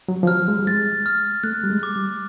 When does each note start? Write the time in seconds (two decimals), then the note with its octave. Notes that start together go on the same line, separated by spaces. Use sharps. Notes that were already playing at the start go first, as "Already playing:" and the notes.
0.08 F#3
0.23 F3
0.27 F#3 F6
0.48 G#3
0.59 G3
0.67 G#3 A6
1.06 F6
1.44 A3 F#6
1.64 G3
1.69 G#3
1.83 D6
1.96 G3